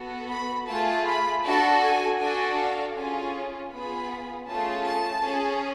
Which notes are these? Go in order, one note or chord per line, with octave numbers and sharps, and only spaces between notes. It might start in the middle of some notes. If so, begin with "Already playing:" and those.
Already playing: B3 F#4 A4
B5
A3 F4 G#4 A5
B5
D4 F#4 A4 A5
G#5
D4 F#4 A4 G#5
F5
C#4 F4 G#4 G#5
B3 F4 G#4 B5
A3 C#4 F4 G#4 A5
A5
C#4 G#4